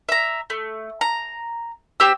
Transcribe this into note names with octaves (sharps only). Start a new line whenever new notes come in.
E5 A#5
A3
A#5
C4 G4 E6